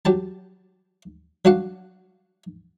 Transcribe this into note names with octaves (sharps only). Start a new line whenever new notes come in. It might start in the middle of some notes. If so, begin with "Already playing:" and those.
F#3 G4 A5
F#3 D4 F#4 F5 F#5